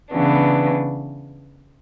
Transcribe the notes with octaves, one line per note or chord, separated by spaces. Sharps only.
C#3 E3 B3 D4